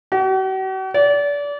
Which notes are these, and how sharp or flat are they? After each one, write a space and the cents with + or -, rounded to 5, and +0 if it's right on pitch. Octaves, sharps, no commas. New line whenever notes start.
F#4 +45
D5 -30